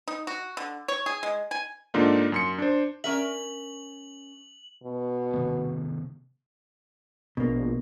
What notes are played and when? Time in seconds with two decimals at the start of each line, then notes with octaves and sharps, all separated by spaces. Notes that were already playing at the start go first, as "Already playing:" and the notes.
0.08 D#4
0.27 F#4
0.57 D3
0.88 C#5
1.06 G#4
1.23 G#3
1.51 G#5
1.94 G#2 D3 A#3 D4 D#4 F4
2.32 F#2 C6 C#7
2.58 D4 C5
3.04 C#4 A#4 E5 F#7
4.84 B2
5.34 C3 D#3 B3
7.37 A#1 B2 A#3